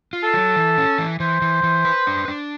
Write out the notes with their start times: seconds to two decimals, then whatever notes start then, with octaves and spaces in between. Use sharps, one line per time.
0.13 F4
0.23 A4
0.34 F#3
0.56 E3
0.78 C#4
0.98 E3
1.20 E3 C5
1.42 E3
1.63 E3
1.85 B4
2.07 D4
2.28 D4